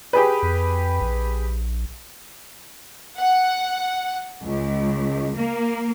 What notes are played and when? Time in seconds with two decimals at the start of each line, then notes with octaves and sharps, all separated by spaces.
0.13 G4 G#4 B4
0.42 F2
1.01 A#1
3.17 F#5
4.44 C#2
5.37 A#3